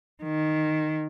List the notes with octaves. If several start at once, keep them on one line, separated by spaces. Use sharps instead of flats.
D#3